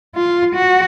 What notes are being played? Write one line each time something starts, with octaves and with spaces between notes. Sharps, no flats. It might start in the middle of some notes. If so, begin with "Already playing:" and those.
F4
F#4